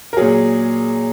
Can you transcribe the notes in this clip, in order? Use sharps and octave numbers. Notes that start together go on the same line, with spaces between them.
A#4
A#2 F#3 G#4